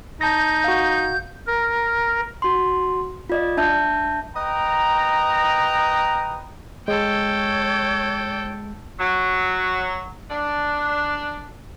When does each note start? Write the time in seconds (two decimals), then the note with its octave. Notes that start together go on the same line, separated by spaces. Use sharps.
0.21 D#4 A5 G6 A#6
0.64 F#4 F5
1.47 A#4
2.42 F#4 C6
3.30 F4 D5 D#5
3.57 D4 E5 A5 G6
4.35 B4 D#5 G5 A#5
6.88 G#3 A4 C#5 G5
8.99 F#3
10.29 D4